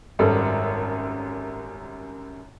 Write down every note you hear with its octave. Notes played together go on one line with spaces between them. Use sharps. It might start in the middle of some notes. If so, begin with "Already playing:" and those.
G#1 F#2 G3 A4